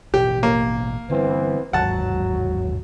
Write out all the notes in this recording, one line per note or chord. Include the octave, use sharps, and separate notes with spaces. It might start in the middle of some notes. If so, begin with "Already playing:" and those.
A1 B2 G4
A#3
D3 E3 G3 B3 C4
G1 D#2 G#2 F#3 F#5 A5